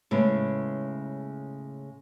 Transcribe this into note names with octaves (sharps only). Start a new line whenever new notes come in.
A2 C#3 G#3 B3